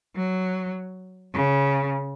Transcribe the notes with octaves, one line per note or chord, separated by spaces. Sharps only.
F#3
C#3